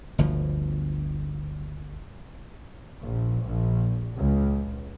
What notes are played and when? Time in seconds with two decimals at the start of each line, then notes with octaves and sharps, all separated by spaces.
0.18 G1 D2 B2 F3
3.01 A#1
3.43 A#1
4.16 C#2